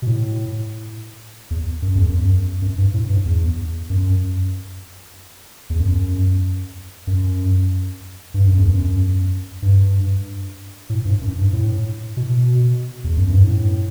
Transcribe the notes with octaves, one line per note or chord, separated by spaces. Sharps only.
B2
A2
E2
F#2
E2
F#2
F#2
G2
A2
G2
E2
F#2
E2
F#2
F#2
G2
F#2
E2
F#2
G2
A2
G2
F#2
G2
A2
B2
E2
F#2
G2
A2